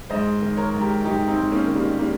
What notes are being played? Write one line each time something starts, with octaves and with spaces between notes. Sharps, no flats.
G#2 C5 D#5
D#3
A#4 C#5
G#2
G4 A#4
G#2 D#4 G4
C4 D#4
G#2
A#3 C#4
D#3
G3 A#3
G3 A#3